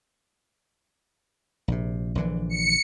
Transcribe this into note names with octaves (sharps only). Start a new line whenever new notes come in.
A#1 C3
A#1 D3 E3
C#7